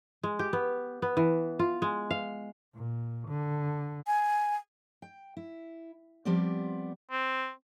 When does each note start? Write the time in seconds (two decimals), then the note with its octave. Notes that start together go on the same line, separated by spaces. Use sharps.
0.23 G#3
0.39 G4
0.53 B3
1.02 B3
1.17 E3
1.59 F4
1.82 G#3
2.11 F5
2.75 A#2
3.28 D3
4.07 G#5
5.02 G5
5.37 E4
6.25 F3 G3 B3 C4 G4 D5
7.11 C4